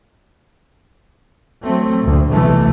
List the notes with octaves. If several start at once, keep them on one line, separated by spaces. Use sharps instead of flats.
F#3 A3 C4
D2 A#2
B1 C3 E3 A3